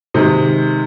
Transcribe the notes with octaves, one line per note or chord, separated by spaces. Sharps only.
C3 D#3 G#3